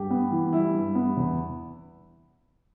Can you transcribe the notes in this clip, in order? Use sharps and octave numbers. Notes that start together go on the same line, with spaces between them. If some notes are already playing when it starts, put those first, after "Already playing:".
Already playing: G2 G4
B3
E3
G3 E4
G2
B3
E2